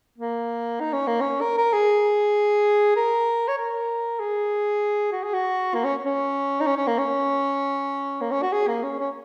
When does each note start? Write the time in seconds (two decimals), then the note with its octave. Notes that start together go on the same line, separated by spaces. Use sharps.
0.18 A#3
0.80 D#4
0.93 C#4
1.07 A#3
1.20 C#4
1.41 A#4
1.57 A#4
1.73 G#4
2.96 A#4
3.48 C#5
3.58 A#4
4.19 G#4
5.12 F#4
5.23 G#4
5.34 F#4
5.74 A#3
5.84 C#4
6.05 C#4
6.61 D#4
6.67 C#4
6.77 C#4
6.87 A#3
6.98 C#4
8.21 A#3
8.31 C#4
8.42 F#4
8.52 G#4
8.67 A#3
8.83 C#4
8.99 C#4